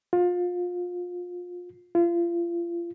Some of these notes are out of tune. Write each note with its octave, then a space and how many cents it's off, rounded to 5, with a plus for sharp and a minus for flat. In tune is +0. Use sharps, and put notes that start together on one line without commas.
F4 +25
F4 -35